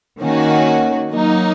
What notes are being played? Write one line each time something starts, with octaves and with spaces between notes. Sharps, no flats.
D#3 A#3 C#4 F#4
F#3 A#3 D#4